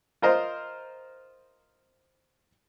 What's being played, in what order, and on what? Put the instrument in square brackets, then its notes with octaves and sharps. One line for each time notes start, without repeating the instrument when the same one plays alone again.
[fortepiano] F4 A#4 C5 D#5